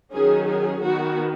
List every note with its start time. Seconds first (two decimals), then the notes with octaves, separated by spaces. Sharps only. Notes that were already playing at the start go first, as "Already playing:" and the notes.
0.12 D#3 F#3 C#4 G#4
0.48 G#4
0.82 D#3 B3 F#4